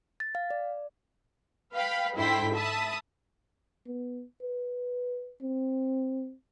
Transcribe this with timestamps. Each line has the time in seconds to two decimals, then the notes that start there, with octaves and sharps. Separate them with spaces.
0.20 A6
0.35 F5
0.50 D5
1.73 B4 F5 G5 B5
2.16 G#2 D3 E4 G5 C6 B6
2.54 E5 A5 B5 D#6
3.87 B3
4.42 B4
5.41 C4